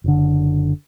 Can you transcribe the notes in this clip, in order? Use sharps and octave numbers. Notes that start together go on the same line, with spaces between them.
F#1 D3